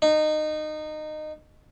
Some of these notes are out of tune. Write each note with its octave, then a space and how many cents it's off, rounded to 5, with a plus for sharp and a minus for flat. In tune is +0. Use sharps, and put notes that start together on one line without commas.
D#4 -20